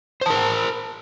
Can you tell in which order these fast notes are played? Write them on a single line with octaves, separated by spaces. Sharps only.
C5 A5 A#4